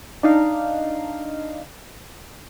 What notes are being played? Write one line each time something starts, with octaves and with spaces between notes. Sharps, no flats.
D4 D#4 F5